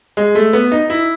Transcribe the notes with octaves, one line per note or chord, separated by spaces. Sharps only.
G#3
A3
B3
D#4
E4